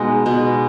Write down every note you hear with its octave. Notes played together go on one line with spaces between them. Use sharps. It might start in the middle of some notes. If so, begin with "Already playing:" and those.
Already playing: B2 G#3 B3 D#4
B2 G#3 B3 D#4